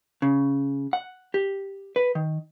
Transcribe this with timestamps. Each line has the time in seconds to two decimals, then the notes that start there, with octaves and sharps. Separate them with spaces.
0.22 C#3
0.93 F#5
1.34 G4
1.96 B4
2.15 D#3